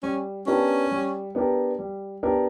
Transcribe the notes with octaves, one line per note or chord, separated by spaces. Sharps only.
G3 C#4
B3 C#4 D4 G4 A#4
G3
B3 D4 G4 A#4
G3
B3 D4 G4 A#4